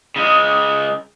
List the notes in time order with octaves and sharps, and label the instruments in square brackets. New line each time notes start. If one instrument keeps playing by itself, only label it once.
[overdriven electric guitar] C#3 G#3